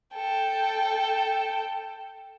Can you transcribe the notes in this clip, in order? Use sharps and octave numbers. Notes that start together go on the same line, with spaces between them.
A4 G5